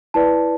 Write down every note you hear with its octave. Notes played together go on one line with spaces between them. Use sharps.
E4 B4 D5 A5